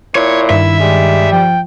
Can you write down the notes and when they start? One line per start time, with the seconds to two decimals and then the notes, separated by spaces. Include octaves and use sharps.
0.15 A#2 E4 C#5
0.50 G2 D#3 E5
0.80 G3 G#3
1.32 F3 G5